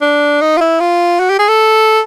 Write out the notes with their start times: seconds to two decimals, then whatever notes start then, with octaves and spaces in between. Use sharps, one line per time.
0.01 D4
0.41 D#4
0.57 F4
0.61 E4
0.80 F4
1.20 F#4
1.30 G4
1.39 G#4
1.48 A4